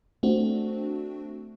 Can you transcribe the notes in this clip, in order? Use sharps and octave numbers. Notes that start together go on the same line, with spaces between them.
A3 C4 D4 F#4